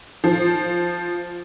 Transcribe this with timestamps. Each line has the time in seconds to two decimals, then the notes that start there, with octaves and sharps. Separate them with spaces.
0.24 F3